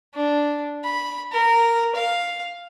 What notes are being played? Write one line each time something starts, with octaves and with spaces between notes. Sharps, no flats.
D4
B5
A#4
F5